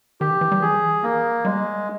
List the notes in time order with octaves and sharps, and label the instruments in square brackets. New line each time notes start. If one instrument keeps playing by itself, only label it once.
[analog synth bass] D#3 [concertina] G4
[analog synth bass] E3
E3
G3
[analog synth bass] E3 [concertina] G#4
[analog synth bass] D#3
E3
[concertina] A#3
[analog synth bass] G3 [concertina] G#3